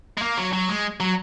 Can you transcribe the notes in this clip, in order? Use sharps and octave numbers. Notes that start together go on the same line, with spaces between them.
G#3
A#3
F#3
F#3
G#3
F#3